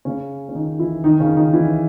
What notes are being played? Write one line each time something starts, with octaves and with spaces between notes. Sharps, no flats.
C#3 C#4
C#4
D#3 D#4
E3 E4
D#3 D#4
C#3 C#4
D#3 D#4
E3 E4